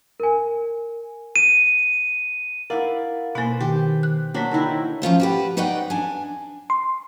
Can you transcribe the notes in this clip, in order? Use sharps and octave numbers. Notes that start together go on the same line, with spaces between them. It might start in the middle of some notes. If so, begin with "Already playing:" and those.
A#4 G#5
D#7
E4 A#4 D5 F5 F#5
B2 A#3 B4 C5
D#3 G4
F#6
F#3 A#3 D4 C5 C#5 B6
D3 D#3 E4
F3 C#4 F4 C5
F#4 G4 B4
D#4 B4 C#5 D5 F#5 G5
D4 G#5
C6